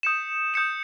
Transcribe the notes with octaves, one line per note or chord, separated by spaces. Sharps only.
D#6 G6 C#7 E7
D#6 G6 C#7 E7